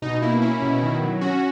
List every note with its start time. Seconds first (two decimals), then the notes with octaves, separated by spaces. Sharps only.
0.02 B2 D#4
0.22 A#3 E4
0.42 C#4 E4
0.62 B2
0.82 D#3
1.02 F#3
1.21 C#4 F#4